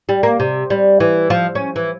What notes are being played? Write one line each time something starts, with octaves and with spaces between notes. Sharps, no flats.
G3
A#3
C3
G3
E3
F3
C#4
E3